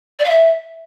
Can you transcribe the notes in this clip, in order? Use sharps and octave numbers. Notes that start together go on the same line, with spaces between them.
D5
F5
E5